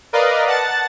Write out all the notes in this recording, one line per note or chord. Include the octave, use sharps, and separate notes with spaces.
A#4 B4 D5 D#5 F5
F#5 A5 A6